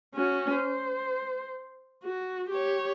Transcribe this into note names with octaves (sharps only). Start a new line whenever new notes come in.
C#4 F#4
C5
F#4
G4 C#5